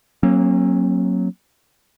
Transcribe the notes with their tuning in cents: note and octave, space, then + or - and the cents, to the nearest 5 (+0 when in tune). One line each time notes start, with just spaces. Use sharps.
F#3 +0 A#3 +0 C#4 -45